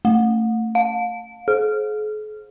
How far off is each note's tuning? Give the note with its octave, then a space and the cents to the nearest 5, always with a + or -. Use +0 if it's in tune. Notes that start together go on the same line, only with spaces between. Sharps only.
A3 +25
F5 +35
G#4 +45